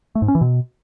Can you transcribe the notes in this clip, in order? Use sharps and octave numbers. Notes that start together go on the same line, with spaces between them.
A3
G#2
C#4
E3
B2